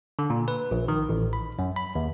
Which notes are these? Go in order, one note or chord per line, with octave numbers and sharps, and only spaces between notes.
D3
A#2
B4
A#1
D#3
A1
B5
F#2
B5
D#2